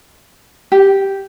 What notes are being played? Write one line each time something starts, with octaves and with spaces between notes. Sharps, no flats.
G4